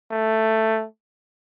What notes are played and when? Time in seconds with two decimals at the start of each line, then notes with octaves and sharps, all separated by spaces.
0.11 A3